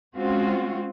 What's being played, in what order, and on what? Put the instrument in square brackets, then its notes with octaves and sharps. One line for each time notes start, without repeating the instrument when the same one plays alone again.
[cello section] G#3 C4 C#4 F4 F#4